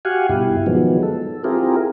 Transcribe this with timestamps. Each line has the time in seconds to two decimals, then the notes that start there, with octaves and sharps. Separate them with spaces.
0.05 F#4 G4 F5 F#5 G#5
0.29 G2 B2 E4 G4
0.66 D#3 F3 F#3 G#3 B3
1.03 A4
1.44 C4 E4 F4 G4 G#4 A#4